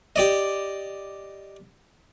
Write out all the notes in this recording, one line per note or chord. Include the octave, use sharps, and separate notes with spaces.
G4 D5 D#5